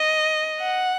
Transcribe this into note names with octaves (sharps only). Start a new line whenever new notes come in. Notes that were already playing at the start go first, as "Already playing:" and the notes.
Already playing: D#5
F#5